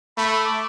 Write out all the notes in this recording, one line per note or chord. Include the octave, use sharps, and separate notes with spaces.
A3 B5
B5
D6